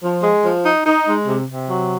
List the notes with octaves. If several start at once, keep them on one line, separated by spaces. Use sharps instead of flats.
F3
G#3
F3
D#4
D#4
G#3
C3
C3
F#3